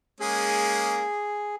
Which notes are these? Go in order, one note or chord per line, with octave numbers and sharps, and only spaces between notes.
G#3 A#3 C#4 G#4